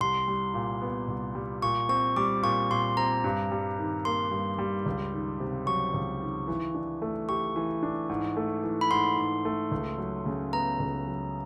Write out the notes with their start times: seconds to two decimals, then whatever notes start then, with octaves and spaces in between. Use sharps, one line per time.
0.01 C2 C6
0.28 G3
0.54 A#2
0.82 B3
1.08 C2
1.35 G3
1.62 A#2 C#6
1.89 C4 C#6
2.16 G3 D6
2.43 A#2 C#6
2.70 A#2 C6
2.97 C4 A#5
3.24 G2
3.51 G3
3.78 D#3
4.05 A#3 C6
4.31 G2
4.58 G3
4.86 C#2
5.13 D#3
5.40 C3
5.66 F#3 C#6
5.94 C#2
6.21 D#3
6.48 E3
6.75 D4
7.02 A3
7.29 G4 C#6
7.56 E3
7.83 D4
8.10 G#2
8.37 A3
8.63 E3
8.81 B5
8.91 G#2 C6
9.17 G#2
9.45 A3
9.72 C#2
9.98 F#3
10.26 C#3
10.53 B3 A#5
10.80 C#2
11.06 F#3